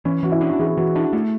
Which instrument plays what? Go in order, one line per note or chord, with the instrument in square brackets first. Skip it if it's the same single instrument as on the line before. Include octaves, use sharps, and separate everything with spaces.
[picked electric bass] E3 [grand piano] C#4
[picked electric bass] E3 [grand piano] F#4
[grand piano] E4
[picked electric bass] D4
[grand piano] F#4
[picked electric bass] E3 [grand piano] G#4
[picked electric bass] E3 [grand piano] F#4
[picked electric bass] D4 [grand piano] E4
[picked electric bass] A3 [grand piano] E4